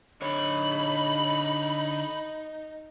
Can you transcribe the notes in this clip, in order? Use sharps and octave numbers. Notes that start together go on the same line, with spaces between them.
D3 D#4 C#5 B5